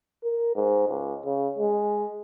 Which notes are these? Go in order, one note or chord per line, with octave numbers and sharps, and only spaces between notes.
A#4
G#2
C#2
C#3
G#3